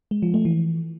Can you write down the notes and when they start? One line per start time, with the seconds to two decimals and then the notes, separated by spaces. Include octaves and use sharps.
0.11 G#3
0.23 F3
0.34 A3
0.45 E3